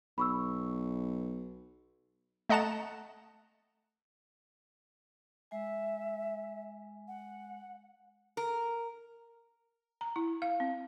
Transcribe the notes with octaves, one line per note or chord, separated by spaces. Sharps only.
B1 B5 C#6 E6
A3 D#5 F#5 A5 A#5 E7
G#3 E5 G#5
F#5
A#4
A#5
E4
F5
C4